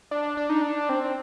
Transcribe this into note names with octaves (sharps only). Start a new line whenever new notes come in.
D4
D4
D#4
D4
C4